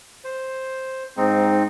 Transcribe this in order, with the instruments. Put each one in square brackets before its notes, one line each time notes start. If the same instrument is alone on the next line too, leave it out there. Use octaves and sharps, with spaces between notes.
[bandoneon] C5
[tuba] G#2 [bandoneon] C4 D#4